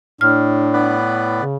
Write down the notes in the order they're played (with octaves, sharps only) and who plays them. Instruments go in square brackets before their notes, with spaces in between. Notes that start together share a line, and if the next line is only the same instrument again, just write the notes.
[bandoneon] A2 [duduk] D4 [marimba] F6
[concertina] B3 B4 D5
[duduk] C#3